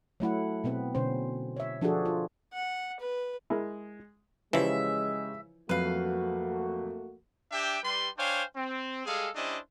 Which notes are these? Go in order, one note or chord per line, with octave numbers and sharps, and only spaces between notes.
F#3 A3 E4 F#5
B2 B3 C4 B4
B2 D3 C#4 C5
C#5 E5
F3 D4 F4 F#4 G#4 A4
F4
F#5
B4
G#3 E4 A#4
C#3 E3 F3 G#3 G4 C#5 E5
F2 F#3 A3 A#3 F#4 B4 F5
D4 G4 E5 G5
G3 B4 C6
D4 C5 C#5 F5 G5 G#5
C4
G3 G#3 G#4 A4 F5
G3 C#4 D4 E4 C5 D#5